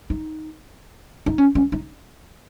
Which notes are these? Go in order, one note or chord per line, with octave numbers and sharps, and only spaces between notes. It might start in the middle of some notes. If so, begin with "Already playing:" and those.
D#4
D#4
C#4
C#4
D#4